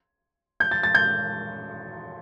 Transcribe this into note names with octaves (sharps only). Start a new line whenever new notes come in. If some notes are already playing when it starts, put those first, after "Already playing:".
G6
A6
A6
G6